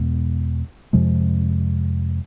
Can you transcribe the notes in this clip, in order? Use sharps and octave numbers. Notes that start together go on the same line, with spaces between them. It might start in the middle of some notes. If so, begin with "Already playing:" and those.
Already playing: E2 B2 G#3 B3
F2 C3 F3 G#3